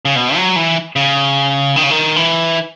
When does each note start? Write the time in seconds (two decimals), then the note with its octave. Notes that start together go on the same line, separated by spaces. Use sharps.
0.05 C#3
0.16 B2
0.36 F#3
0.56 E3
0.96 C#3
1.76 D#3
1.83 C#3
1.91 D#3
2.16 E3